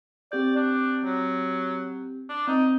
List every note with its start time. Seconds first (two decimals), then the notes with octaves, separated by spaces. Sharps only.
0.32 C4 G4 D5 G6
0.56 D4
1.04 F#3
2.29 D4
2.47 C4 D#4 D#5